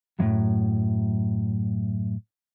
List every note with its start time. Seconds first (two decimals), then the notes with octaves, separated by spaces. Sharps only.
0.19 F#2 A2 C3 E3 F#3